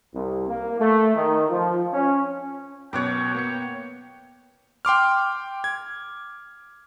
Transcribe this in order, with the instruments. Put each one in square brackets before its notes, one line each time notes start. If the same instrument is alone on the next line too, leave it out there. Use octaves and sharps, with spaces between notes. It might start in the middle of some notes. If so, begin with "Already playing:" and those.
[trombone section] C2
A#3
A3
D#3
F3
C#4
[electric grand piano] F#2 B2 B3 [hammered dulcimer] C#5 F#5 D6 [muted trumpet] G5
[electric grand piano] A#3 B3 C#7
G5 C6 D6 F6
G#6